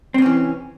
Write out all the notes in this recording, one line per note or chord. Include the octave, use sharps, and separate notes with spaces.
C3 E3 C4 C#4